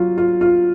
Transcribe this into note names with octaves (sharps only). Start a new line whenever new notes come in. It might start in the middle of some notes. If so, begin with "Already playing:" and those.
Already playing: F#3 F4
F4
F4